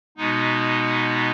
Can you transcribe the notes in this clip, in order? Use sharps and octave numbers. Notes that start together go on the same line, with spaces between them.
B2 G#3 B3 D#4